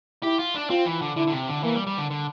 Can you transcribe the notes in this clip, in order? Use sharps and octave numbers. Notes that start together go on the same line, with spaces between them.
E4 G4
F4
D4
C4 F4
E3
D3
D3 E4
D3
C3
D3
E3 A#3
G3
G3
D3
D3